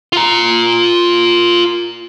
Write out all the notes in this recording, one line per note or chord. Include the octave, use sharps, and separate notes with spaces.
F4 A#5